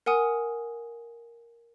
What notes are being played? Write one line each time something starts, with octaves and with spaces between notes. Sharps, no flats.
A#4 F#5 G#5 D#6